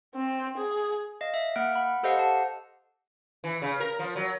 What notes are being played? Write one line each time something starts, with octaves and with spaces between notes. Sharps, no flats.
C4
G#4
D#5 F5
E5
A#3 F#5 F6 F#6 D7
F#5 B5
G4 A4 C5 D#5 F5 F#5
F#5 A5
E3
C#3
A#4
F3
F#3